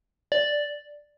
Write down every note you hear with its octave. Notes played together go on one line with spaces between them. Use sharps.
D5